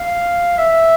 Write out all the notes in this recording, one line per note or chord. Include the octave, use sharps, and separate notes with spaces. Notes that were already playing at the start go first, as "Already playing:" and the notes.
Already playing: F5
E5